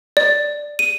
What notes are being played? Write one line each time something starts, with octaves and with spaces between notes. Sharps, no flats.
D5
D#7